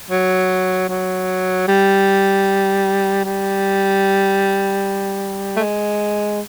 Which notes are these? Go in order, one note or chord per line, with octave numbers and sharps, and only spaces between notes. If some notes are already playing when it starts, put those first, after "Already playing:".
F#3
F#3
G3
G3
A3
G#3